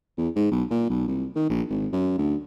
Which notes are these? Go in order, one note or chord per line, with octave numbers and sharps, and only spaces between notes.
E2
G#2
B1
A#2
B1
C2
D#3
A#1
G#1
F#2
D2